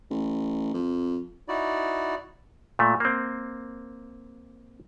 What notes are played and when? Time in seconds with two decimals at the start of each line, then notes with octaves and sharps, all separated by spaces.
0.11 A1
0.74 F2
1.48 D#4 E4 F#4 D5
2.79 A#2 A3
3.00 A#3 C4